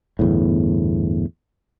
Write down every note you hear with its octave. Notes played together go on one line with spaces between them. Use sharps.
G1 E2 A2